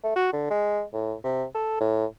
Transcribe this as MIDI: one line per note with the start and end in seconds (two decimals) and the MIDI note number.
0.04 0.14 57
0.16 0.28 66
0.33 0.49 50
0.50 0.82 56
0.94 1.15 45
1.24 1.44 48
1.55 1.76 69
1.81 2.06 45